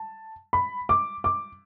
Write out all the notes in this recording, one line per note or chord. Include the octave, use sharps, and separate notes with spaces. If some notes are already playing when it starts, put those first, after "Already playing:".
Already playing: A5
B5
D6
D6